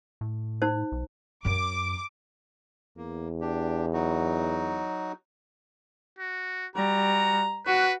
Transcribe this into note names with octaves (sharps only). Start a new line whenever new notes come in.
A2
D#4 C5
B1
F#2 C#4 D6
E2 A#3
D4 G4
F#3 D#4 F#4
F#4
G3 F#4 A#5
F#4 B4